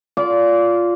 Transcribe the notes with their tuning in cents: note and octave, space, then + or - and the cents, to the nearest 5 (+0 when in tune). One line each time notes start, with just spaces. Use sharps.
F4 +0 D5 -25